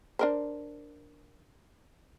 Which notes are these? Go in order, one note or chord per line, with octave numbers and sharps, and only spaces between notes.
D4 A#4 C5